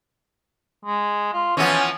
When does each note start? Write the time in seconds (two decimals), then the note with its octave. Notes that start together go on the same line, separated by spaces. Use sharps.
0.85 G#3
1.33 F4
1.57 E3 F3 B3 C#4